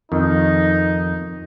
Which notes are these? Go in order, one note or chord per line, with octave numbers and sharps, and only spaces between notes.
F2 D#3 D#4